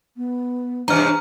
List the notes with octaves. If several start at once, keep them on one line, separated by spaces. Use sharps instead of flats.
B3
G2 C3 E3 D4 C#5 A#5 F6